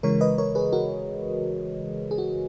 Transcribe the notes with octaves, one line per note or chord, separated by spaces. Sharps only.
C#3 E3 G#3 A#4 C#5
B4 D#5
A#4 C#5
G#4 B4
F#4 A#4
G#4
F#4